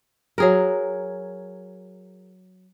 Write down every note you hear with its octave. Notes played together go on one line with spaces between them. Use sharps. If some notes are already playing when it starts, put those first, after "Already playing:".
F#3 G#4 A#4